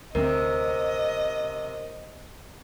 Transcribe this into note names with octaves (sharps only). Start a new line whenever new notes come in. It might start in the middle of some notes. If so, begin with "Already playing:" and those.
D2 C3 G3 C4 A#4 D#5